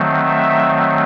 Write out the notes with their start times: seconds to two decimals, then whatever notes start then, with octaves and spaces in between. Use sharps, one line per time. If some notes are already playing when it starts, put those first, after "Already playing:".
Already playing: D#3 F#3 A3 C4
0.26 E5